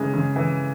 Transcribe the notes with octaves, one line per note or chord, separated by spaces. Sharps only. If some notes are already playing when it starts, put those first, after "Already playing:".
Already playing: C#3 E3 G#3
C#3
E3